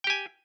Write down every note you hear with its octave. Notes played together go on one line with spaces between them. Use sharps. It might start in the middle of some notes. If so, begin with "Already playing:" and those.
G4 G5 G#5